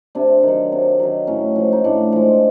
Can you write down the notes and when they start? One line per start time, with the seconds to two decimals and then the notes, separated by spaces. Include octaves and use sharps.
0.15 C3 D4
0.43 D#3
0.48 F#3
0.72 C3
1.00 D#3 F#3
1.27 A2 C#4
1.56 F3 G#3
1.72 D#4
1.84 A2 D4
2.12 F3 G#3